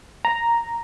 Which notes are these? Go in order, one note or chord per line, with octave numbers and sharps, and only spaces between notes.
A#5